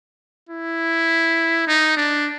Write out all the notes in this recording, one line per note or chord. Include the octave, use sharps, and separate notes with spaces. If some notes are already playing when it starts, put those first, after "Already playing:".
E4
D#4
D4